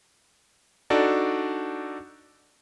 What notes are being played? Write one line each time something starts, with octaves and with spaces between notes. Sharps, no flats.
D4 D#4 F#4 A4 D5